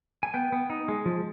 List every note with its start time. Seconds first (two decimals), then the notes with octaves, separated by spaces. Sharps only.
0.23 G#5
0.34 B3 G5
0.52 B3
0.70 D#4
0.88 G#3
1.06 F3